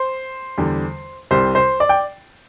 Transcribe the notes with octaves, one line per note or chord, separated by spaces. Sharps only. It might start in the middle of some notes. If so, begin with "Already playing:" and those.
Already playing: C5
E2 D3 G3
C2 C3 G3 C5
C5
D5
G5